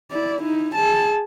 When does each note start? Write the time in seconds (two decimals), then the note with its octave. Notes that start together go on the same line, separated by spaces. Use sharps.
0.11 E4 D5
0.42 D#4 E4
0.75 G#4 A5